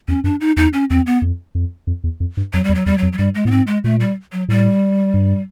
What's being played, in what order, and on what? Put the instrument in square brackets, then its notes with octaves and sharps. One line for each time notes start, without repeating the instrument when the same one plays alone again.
[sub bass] E2 [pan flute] C#4
[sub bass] F#2 [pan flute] D4
[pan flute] D#4
[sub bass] E2 [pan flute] D#4
[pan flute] C#4
[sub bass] E2 [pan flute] C4
[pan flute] B3
[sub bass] F2
F2
F2
E2
F2
G2
[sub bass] F2 [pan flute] F#3
[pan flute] G3
[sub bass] E2
[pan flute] F#3
[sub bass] E2 [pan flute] G3
[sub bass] F2 [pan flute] F#3
[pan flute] F#3
[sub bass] G2 [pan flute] G3
[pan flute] G#3
[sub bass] A2 [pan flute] B3
[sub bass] G#2 [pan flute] C4
[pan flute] G#3
[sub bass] A#2 [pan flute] A3
[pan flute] G3
F#3
[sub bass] A2 [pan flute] G3
[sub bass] G2